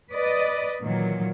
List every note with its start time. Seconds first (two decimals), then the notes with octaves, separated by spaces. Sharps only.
0.12 B4 D5 D#5
0.82 A#2 D#3 E3 F#3